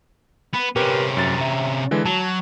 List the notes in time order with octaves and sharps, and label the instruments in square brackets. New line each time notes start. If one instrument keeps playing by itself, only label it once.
[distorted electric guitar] B3
[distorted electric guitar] C3 C#4 [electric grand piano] G4 A#4 B4
[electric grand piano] F#2 A6
E5 A#5
D3 E3 G#3
[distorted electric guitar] F#3 [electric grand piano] A5